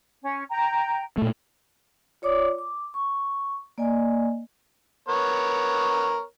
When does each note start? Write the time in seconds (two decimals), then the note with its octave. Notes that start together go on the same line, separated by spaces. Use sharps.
0.21 C#4
0.49 G5 A#5
1.18 A#2 A3
2.22 F4 C#5 D5 D6 D#6
2.58 D6
2.94 C#6
3.78 A#3 D5 D#5 G#5
5.08 B3 A#4 C#5